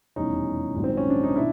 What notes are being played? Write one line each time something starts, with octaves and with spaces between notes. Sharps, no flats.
F1 E2 B2 G3 C#4 D#4
A#1 G#2 D#3 F#3
C4
C#4
D4
D#4
B2 D4 E4